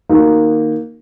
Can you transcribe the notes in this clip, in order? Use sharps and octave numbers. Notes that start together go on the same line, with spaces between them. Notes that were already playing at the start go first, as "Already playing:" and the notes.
D#3 A#3 D#4 F#4